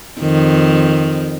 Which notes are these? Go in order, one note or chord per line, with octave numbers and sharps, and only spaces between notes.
F2 D#3